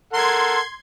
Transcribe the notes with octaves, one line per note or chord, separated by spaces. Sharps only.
A4 A#4 F#5 C6 G#6